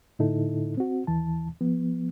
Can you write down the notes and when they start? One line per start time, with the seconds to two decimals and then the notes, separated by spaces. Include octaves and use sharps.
0.19 A2 D3 D#4 E4 A4
0.77 C4 F#4
1.07 D#2 E3 A5
1.61 F3 B3